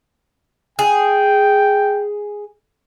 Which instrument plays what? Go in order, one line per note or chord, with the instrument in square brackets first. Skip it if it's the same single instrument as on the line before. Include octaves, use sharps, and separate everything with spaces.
[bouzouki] G#4 [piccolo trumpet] G5